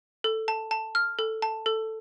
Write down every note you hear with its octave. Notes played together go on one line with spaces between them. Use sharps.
A4
A5
A5
F6
A4
A5
A4